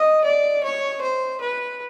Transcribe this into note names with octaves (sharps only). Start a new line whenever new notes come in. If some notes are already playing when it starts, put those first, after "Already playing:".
Already playing: D#5
D5
C#5
C5
B4